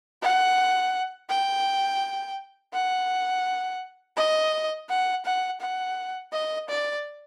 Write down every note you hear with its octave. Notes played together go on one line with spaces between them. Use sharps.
F#5
G5
F#5
D#5
F#5
F#5
F#5
D#5
D5